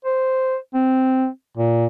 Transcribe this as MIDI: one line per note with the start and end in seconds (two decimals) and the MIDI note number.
0.05 0.56 72
0.74 1.27 60
1.57 1.86 46